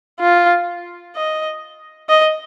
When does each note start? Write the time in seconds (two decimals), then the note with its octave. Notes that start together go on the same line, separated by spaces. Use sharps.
0.20 F4
1.16 D#5
2.09 D#5